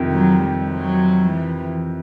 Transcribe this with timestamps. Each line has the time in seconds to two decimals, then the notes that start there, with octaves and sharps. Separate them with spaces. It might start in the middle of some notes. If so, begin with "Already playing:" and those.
Already playing: F2 C3 D#3
0.13 F#3
0.42 G3
0.72 F#3
1.31 E3